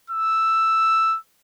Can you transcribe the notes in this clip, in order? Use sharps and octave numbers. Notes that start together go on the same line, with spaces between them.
E6